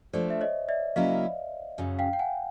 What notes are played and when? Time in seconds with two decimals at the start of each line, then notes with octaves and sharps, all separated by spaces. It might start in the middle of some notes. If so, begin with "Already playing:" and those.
0.13 F3 A3 D4 C5 D5
0.30 E5
0.41 C#5 D#5
0.69 D5 E5
0.96 C#3 F#3 A#3 C#4 E4 D#5 F5
1.78 F#2 C#3 F#3
1.99 F5 G5
2.13 G5
2.19 F#5 G#5